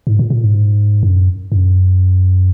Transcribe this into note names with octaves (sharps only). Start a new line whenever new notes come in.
G#2
A#2
A#2
G#2
F#2
F#2